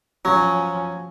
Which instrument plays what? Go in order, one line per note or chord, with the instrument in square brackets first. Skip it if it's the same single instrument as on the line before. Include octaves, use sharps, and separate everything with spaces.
[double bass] F3 C#4 [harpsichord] F#3